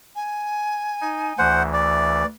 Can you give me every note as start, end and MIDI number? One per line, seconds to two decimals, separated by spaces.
0.16 1.56 80
1.01 1.33 63
1.39 2.23 38
1.39 2.23 52
1.39 1.63 72
1.39 1.63 78
1.73 2.26 74